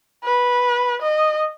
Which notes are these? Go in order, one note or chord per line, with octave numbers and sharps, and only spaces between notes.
B4
D#5